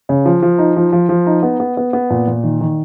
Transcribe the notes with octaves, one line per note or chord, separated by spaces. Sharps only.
C#3
F3
F3
D#4
F3
F3
F3
D#4
B3
B3
B3
B3
A#2
A#2
D#3
D#3